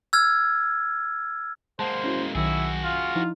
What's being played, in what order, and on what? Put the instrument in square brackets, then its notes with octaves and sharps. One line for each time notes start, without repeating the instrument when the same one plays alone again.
[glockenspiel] E6 F6 G#6
[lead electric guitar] G#3 A#3 [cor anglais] C5 [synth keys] F#5 A5
[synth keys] C#4 E4 F#4
[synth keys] B1 D#3 F#3 [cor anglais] E4 [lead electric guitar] F#4 G#4
[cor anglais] F4
[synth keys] F3 D#4 E4